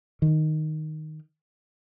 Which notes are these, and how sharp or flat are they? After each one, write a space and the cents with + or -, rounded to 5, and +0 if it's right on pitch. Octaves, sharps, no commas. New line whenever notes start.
D#3 -5